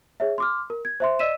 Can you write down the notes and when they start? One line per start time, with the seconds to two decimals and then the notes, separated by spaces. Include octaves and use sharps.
0.20 G#4 C#5 E5
0.38 C6 D6 F6
0.70 A#4
0.85 G#6
1.00 C5 E5 C6
1.19 D5 D#5 E6 B6 D#7 E7